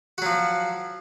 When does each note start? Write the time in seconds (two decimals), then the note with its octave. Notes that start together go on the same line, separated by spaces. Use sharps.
0.18 F#4
0.22 F#3
0.26 F3